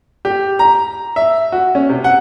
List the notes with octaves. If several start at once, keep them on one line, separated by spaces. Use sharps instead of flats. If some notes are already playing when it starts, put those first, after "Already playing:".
G4
A#5
E5
F#4
C#4
C3
F#5